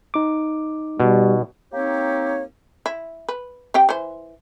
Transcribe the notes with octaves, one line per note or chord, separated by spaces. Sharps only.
D#4 D6
B2 G3
A#3 C4 D#4 G4 C#5
E4
B4
C4 G4 G5
E3 C5